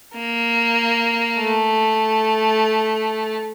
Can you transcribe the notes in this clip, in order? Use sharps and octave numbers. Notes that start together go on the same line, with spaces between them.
A#3
A3